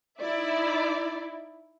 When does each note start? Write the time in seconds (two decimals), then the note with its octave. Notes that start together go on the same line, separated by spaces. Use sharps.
0.19 D#4 E4 D5 E5